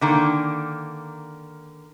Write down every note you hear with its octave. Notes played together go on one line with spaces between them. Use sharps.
D3 D#3 A#3